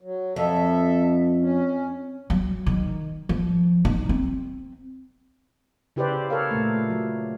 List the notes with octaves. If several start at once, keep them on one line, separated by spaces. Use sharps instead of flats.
F#3
F2 A4 E5
C#4
F#3
D#3
F3
D#4
C4
C#3 E4 G4 B4 C5 D5
A4 A#4 C#5 F5
A#2 A3
F#3